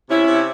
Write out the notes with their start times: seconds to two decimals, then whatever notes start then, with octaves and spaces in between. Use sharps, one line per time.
0.09 C3 C#4 E4
0.27 C3